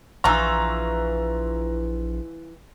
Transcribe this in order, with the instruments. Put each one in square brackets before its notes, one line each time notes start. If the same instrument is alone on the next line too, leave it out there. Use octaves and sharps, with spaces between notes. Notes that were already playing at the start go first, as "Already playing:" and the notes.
[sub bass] A#1 [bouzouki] E3 F4 [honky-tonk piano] A#5 C#6 E6